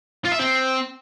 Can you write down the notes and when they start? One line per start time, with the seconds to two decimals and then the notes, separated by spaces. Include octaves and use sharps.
0.25 F4
0.32 E5
0.39 C4